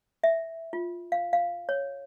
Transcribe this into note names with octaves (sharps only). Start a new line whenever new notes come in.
E5
F4
F5
F5
C#5